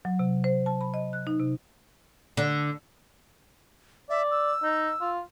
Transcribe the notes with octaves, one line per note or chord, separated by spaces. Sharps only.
F#3
C3
C5
A5
B5
D#5
F#6
D#4
C3
D3
D5 E5
E6
D#4
F4